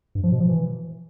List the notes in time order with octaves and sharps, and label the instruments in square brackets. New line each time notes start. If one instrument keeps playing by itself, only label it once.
[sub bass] G2
F3
B2
F3
E3